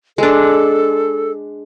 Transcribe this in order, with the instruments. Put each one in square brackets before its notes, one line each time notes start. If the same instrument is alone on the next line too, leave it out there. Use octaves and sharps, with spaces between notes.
[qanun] G#3 D4 [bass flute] A4